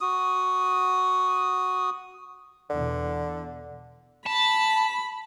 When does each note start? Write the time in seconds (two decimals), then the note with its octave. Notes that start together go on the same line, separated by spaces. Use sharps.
0.01 F#4 D#6
2.70 E2 B2 D3
4.27 A5 B5